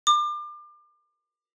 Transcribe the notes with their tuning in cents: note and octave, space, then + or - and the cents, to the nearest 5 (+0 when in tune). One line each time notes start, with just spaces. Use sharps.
D6 +35